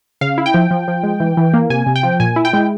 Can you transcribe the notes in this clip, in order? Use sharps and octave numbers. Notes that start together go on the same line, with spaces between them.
C#3 F5
E4
G5
F3
F3
F3
G#3
E3
E3
A#3
C3 G#5
C3
G5
F3
A#2 G#5
E4
G5
G#3